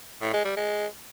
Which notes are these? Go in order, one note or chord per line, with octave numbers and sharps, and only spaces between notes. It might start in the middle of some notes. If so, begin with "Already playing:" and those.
A2
G#3
G3
G#3